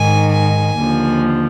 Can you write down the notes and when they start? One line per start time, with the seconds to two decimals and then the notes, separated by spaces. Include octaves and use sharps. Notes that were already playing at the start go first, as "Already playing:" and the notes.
Already playing: G#2 D#3 G#5
0.33 G#5
0.78 D#2 D3 F3